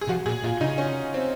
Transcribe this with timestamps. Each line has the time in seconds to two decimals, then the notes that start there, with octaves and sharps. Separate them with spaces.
0.01 G#4
0.09 F3 F#4
0.26 A#2 G#4
0.43 A#2 F4
0.61 C#3 D#4
0.78 C#4
1.14 C4